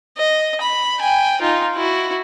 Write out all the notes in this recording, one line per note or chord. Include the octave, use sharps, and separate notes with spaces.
D#5
B5
G5 G#5
D#4 F4
E4 F#4